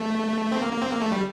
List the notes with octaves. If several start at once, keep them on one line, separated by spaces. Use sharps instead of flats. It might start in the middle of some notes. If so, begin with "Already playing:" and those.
Already playing: A3
C4
A#3
A#3
C4
A#3
A3
G3